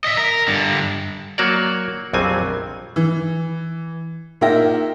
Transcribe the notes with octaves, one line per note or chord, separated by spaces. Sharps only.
D#5 E5
A#4
G2 D3
F#3 A#3 F#4 C#5 D5
A#1 F2 F#3 G3 C4 G#5
E3
A#2 D#4 A#4 E5 G5 A#6